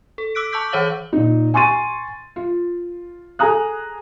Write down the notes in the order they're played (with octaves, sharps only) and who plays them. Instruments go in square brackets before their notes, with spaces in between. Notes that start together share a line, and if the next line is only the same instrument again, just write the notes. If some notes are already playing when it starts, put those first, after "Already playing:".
[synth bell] A4
D6 E6 F#6 B6 D7
A5 C#6 D6 E6 G6 B6
E3 C5 C#5 F5 F#7
[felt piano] A#2 D#4
G#5 C6 C#6 A6 D#7
F4
G#4 A4 G#5 A#5 D#6 F#6